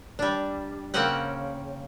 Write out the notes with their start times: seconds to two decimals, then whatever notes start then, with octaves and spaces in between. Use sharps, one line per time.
0.19 G3 D4
0.94 C#3 A#3 C4 C#4 F#5 G5